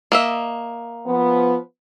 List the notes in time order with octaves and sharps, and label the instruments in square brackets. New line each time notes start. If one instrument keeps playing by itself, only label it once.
[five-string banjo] A#3 D#5 E5
[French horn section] F3 B3